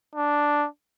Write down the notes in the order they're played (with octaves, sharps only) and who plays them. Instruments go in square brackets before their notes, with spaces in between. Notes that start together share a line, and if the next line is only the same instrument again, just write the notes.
[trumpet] D4